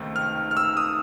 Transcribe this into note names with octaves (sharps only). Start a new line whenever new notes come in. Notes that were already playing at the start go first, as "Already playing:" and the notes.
Already playing: C#2 C3 D#3 A3
F6
F6
E6
D#6